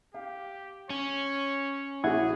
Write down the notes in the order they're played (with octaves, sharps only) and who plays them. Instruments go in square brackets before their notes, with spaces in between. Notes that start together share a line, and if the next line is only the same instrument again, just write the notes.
[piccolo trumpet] G4 [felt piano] F5
[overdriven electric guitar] C#4 [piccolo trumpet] C#5
[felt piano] A#1 F#4 [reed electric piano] E4 F#5 G#6 [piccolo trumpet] G#4